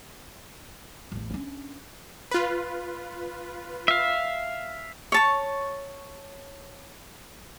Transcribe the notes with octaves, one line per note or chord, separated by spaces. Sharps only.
A1 E2
C#4 D4
F4 B4
E5 F5
C#5 A5 C#6